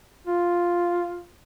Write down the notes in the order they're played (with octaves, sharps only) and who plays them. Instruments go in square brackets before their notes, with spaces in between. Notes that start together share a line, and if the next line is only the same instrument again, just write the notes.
[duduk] F4